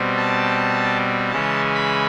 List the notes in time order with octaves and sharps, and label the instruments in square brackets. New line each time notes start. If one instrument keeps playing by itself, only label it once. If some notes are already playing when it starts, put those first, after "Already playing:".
Already playing: [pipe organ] B2 G3 C4
A5
C#3 E3 G#3 C#4 A5
B5